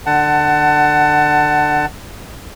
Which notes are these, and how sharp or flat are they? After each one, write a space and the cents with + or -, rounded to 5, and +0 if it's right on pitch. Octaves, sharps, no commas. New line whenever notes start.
D3 +20 F#5 +20 A5 +15